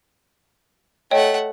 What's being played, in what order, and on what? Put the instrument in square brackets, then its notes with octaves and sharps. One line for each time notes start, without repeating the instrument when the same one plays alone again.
[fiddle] A3 F#5 [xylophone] C#5 D#5 G5